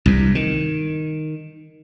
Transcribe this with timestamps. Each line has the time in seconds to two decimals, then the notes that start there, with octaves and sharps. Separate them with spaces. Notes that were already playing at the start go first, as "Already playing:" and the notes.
0.06 C2 G2
0.35 D#3